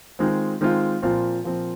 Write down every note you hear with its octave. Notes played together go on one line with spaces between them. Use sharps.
D#3 G#3 C4 F4
D#3 G#3 C4 F4
A#2 F3 C4 F4
A#2 F3 C4 F4